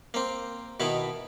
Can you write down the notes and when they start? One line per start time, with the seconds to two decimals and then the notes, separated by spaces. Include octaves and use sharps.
0.14 A#3 C4
0.80 B2 D#3 B3 E4